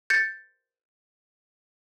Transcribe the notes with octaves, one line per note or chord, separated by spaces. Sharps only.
G6 A6 C#7